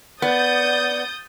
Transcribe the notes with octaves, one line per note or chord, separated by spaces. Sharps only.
B3 D5 D#6 G6 A6